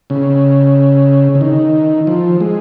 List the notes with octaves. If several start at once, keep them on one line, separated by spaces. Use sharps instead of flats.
C#3
C#3
D#3
F3
G#3